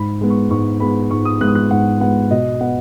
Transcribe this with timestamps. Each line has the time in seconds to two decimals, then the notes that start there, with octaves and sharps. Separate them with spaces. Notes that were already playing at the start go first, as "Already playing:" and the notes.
Already playing: G#2 B5
0.21 G#3 B3
0.30 C#6
0.50 G#2 C#6
0.80 G#3 B3 B5
1.11 G#2 C#6
1.25 D#6
1.41 G#3 B3 F#6
1.48 D#6
1.55 F#6
1.71 G#2 F#5
2.01 G#3 B3 F#5
2.31 B2 D#5
2.60 B3 F#5